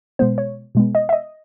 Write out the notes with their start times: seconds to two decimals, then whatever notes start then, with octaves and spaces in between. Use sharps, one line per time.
0.19 B2 G#3 B3 C5
0.38 C#5
0.75 B2 G#3 B3
0.95 D#5
1.09 E5
1.13 D#5